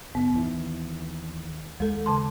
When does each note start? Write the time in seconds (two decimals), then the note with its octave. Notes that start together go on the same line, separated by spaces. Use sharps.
0.15 F#1 B3
0.34 D#2 D#3 E3
1.80 D#2 G#3 A4
2.06 C#3 A5 C6